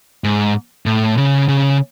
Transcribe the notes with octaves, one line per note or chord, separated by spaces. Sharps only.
G#2
A2
C#3
C#3